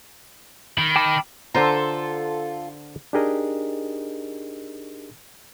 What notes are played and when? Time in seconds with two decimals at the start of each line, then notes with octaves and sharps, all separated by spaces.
0.78 D#3 B5
0.96 G5 A5 D6
1.55 D3 F4 A4 C5 A#5
3.13 D4 D#4 G4 G#4 A#4 D#5